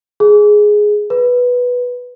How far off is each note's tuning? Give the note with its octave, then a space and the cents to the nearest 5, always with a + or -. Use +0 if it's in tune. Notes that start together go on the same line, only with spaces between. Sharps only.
G#4 +5
B4 -5